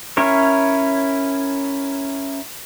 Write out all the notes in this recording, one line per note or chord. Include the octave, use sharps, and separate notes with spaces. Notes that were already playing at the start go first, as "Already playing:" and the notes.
C#4 E4 A#4 C#5